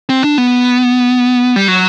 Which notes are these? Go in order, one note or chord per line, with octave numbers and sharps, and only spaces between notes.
C4
D4
B3
G3
F#3